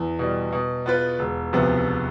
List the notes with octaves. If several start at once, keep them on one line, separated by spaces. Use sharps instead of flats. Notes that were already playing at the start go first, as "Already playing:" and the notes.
Already playing: E2
B2 G3
B2
B3 F4 B4
E1
D2 C3 F3 B3